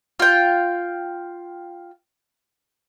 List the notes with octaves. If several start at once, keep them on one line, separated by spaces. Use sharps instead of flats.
F4 G5